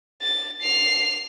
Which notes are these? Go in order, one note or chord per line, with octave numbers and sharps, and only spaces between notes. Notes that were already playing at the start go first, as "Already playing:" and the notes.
A6
C7 F7